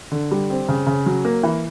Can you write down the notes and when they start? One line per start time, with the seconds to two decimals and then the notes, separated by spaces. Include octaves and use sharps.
0.12 D3
0.31 G3
0.50 C4
0.69 C#3
0.87 C#3
1.06 F#3
1.25 A#3
1.43 E3